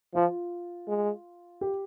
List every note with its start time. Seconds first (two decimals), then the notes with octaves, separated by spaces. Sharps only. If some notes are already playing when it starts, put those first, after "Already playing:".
0.15 F3 F4
0.88 G#3
1.61 G4